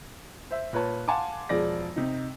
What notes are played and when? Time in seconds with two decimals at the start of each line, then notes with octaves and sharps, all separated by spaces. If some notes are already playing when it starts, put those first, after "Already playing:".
0.51 C5 E5
0.73 A#2 B4 C#5 A5
1.08 F5 F#5 G#5 A5 C6 D6
1.49 E1 F3 G#4 D5 A#6
1.96 C3 D#4